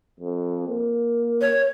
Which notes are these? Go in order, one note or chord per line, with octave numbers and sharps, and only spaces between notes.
F2
A#3
C#5